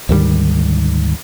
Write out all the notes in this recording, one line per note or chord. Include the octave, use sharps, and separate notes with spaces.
D2 G#2 D#3 G3